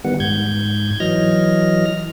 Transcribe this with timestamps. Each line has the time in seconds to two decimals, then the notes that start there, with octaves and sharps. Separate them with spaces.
0.05 D#3 G3 B3 F#5
0.20 G#2 G6 G#6
1.00 E3 F#3 D#5 F6 A#6